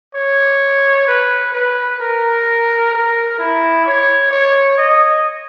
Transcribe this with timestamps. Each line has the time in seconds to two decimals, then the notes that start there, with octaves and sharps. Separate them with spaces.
0.15 C#5
1.07 B4
1.53 B4
2.00 A#4
2.93 A#4
3.39 E4
3.86 C#5
4.31 C#5
4.78 D#5